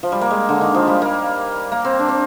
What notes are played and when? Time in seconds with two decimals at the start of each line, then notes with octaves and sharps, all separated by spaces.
0.03 F3
0.12 G3
0.21 A#3
0.31 G#3
0.49 D3
0.61 D#3
0.74 F3
0.88 G3
1.02 A#3
1.72 A#3
1.85 C4
1.99 D4
2.08 C4